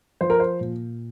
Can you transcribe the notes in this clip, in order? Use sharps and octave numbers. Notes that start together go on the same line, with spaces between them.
F3 C5
A#4
C5
A#2